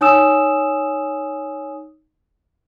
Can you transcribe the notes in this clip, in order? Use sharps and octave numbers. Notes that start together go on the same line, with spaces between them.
D#4 C#5 G#5 D#6 E6 E7